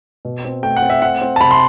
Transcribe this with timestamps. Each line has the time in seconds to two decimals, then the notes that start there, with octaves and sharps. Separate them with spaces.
0.25 B2
0.45 C4
0.63 A3 G5
0.76 F#5
0.82 C4
0.90 E5
1.02 C4 F#5
1.21 C4
1.36 A5
1.41 C3 B5
1.51 C6